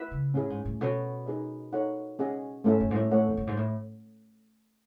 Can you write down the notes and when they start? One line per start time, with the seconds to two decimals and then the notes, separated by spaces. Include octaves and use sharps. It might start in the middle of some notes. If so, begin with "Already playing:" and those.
Already playing: E4 B4 E5
0.11 C#3
0.34 A2 C#4 E4 G#4
0.50 G#2
0.65 A2
0.81 B2 C#4 F#4 A4 C#5
1.26 D#4 G#4 B4 D#5
1.73 D#4 A4 C#5 F#5
2.19 C#4 G#4 D#5 F#5
2.64 G#2 A3 C#4 E4 A4 E5
2.80 F#2
2.91 G#2
2.95 A2
3.11 A3 E4 A4 C#5 F#5
3.27 E2
3.37 F#2
3.47 G#2
3.57 A2